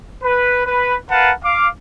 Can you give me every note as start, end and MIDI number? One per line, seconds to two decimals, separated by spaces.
0.24 0.64 71
0.66 0.96 71
1.11 1.32 70
1.11 1.32 71
1.11 1.32 77
1.11 1.32 78
1.11 1.32 81
1.44 1.67 77
1.44 1.67 86